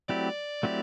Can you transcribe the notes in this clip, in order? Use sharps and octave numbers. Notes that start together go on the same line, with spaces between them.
F#3 A3 C4 E4 G4 D5
F#3 A3 C4 E4 G4